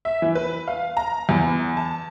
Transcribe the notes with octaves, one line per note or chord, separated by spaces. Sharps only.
E5
E3
B4
F5
A#5
E2
A5